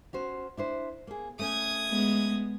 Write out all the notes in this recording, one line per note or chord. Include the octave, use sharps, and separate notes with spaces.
C#4 F#4 C5
D4 E4 C5
A#3 G#4
A3 C#4 D#6 G#6
G#3 B3